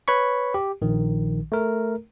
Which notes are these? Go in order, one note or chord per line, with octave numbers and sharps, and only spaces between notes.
B4 C#5 B5 C#6
G4
A#1 D#3
A3 A#4